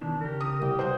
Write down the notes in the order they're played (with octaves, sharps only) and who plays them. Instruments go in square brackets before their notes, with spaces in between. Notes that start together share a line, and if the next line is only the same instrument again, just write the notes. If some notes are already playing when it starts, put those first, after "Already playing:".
[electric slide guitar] B2 D#3 E3 [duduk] D4
[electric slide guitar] C#3 G4 [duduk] A#4
[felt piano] D#6
[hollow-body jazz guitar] C2 [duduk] G4
[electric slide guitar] F#4 [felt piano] C5 G6